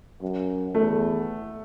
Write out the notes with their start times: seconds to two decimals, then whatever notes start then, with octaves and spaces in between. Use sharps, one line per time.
0.22 F#2
0.74 E2 A3